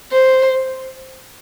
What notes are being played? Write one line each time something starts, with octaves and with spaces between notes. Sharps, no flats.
C5